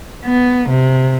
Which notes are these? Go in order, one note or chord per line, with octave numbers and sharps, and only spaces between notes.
B3
C3